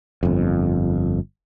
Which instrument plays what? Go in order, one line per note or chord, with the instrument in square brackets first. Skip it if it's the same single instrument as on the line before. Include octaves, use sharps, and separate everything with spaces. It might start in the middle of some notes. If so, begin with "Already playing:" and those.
[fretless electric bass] G1 F2